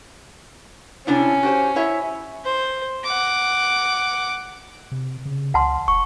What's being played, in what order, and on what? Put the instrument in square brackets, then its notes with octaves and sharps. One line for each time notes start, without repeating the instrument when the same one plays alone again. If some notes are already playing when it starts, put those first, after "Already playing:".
[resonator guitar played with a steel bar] C3 D4 E4 [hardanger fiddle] C#4
[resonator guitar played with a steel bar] F#4 G4 C5
E4 C#5 E5
[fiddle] C5
F#5 D6
[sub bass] C3
C#3
[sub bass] C#2 [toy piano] F#5 A5 C6
[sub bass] E1 [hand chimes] C#6